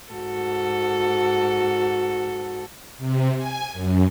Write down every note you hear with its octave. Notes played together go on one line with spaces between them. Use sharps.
G#2 F#4 A4
C3
G#5
F#2